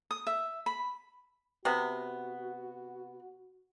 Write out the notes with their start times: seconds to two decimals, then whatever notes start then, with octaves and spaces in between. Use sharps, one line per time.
0.11 D#6
0.27 E5
0.66 B5
1.65 C3 B3 F#4